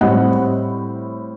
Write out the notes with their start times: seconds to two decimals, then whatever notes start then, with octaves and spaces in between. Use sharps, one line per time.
0.01 A2 G3 C4 D#5 F#5